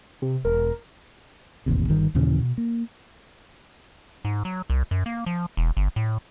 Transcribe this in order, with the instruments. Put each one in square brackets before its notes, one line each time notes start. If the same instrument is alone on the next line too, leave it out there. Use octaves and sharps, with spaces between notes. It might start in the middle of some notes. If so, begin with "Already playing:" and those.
[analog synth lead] C3
[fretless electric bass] E1 [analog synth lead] A#4
[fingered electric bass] E1 A1 D#2 C3
G1 D#3 G3
D#2 A#2 C#3 E3
B2
A#3
[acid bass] G#2
F#3
C2
F#2
A#3
F3
E1
G1
A2